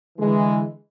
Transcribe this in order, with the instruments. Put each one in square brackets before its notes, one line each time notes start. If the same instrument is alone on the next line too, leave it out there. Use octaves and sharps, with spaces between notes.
[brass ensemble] D3 E3 G#3